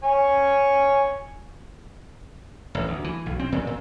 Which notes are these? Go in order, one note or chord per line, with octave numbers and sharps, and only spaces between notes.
C#5 G#5
A1
D2
E3
B1
C4
A#2
A#2